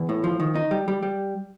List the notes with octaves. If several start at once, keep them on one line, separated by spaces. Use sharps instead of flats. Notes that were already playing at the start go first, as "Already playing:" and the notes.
Already playing: E2
A2
F3
D#3
D#4
G3
G3
G3